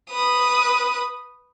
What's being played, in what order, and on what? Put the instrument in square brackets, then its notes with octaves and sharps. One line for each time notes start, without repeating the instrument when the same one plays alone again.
[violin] B4 D#6